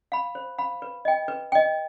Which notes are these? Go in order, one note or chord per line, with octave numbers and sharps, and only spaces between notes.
F5 B5
C5
F5 B5
B4
D#5 G5
B4
D#5 G5